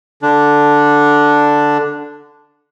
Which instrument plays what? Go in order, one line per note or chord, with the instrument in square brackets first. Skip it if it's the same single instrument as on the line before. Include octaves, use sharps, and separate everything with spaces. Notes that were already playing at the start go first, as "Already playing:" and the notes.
[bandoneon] D3 D4